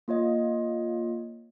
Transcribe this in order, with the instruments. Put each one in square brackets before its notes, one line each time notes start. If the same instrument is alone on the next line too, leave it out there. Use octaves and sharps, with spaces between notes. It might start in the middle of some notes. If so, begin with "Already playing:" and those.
[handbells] A#3 F4 C#5 D#5